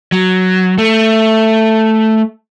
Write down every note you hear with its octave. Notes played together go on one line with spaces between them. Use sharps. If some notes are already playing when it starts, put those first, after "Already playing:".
F#3
A3